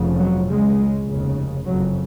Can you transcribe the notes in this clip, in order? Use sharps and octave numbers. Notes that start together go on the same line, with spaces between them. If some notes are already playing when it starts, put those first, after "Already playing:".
Already playing: F1 F2 C#3
F#3
C#2 C#3 G#3
F1 D#2 C#3
F#1 F2 C#3 F#3